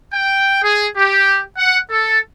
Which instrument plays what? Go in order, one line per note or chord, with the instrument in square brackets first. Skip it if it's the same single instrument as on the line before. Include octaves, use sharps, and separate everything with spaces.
[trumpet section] G5
G#4
G4
F#5
A4